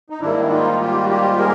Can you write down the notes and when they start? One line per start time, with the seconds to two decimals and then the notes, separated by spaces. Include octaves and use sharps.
0.10 D#4
0.20 G#2 D#3 G3 A#3 D4 E4
0.50 D#4 F4
0.80 F4 G4
1.03 F#4
1.09 F4 G4
1.38 G#4 A#4